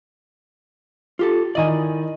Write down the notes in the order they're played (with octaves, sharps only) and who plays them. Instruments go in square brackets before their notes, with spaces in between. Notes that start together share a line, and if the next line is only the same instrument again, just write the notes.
[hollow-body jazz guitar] F4 G4 A4
[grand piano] D#3 E4 [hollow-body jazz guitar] D5 D#5 G#5